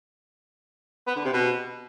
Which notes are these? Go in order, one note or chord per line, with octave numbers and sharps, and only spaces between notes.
B3
D3
C3
B2